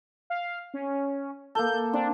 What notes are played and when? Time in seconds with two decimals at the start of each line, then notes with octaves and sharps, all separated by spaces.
0.30 F5
0.74 C#4
1.55 A#3 A4 G6
1.93 C4 D4